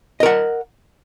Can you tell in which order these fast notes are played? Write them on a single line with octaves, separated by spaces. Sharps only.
D#5 A#4 F#5